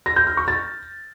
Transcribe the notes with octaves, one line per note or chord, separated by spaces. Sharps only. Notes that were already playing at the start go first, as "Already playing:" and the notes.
A#6
G6
F6
C#6
A6